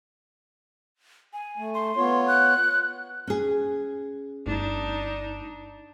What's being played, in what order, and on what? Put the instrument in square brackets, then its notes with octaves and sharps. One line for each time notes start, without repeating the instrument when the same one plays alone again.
[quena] G#5
[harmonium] A3
[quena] C6
[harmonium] B3 F4 C#5
[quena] F#6
[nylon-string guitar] C#4 G#4
[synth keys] G1 E7 [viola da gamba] D4 D#4